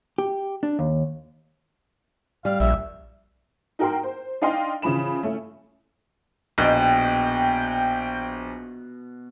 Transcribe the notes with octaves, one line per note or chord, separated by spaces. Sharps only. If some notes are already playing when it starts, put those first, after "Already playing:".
G4
D4
D#2
G3 F5
A#1 E5
D#4 F#4 A#4 G5 C6
C5
D4 D#4 D#5 F5 G5 C6
C#3 E3 F3 B5 E7
A3 C#4 E4
A#1 B2 G5